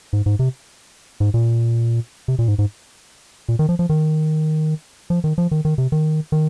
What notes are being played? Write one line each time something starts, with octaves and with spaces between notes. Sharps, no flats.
G#2
G#2
C3
G#2
A#2
C3
A#2
G#2
G#2
A#2
D#3
F3
F3
D#3
F3
D#3
F3
D#3
D#3
C3
D#3
D#3